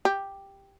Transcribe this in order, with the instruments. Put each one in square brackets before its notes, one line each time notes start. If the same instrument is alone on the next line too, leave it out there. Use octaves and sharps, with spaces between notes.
[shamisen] G4